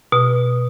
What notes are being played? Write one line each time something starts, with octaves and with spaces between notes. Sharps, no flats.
B2